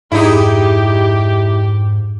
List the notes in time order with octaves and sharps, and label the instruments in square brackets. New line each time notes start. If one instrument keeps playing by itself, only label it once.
[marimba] F2 G#4 [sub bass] G#2 [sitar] D#4 E4 [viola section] G4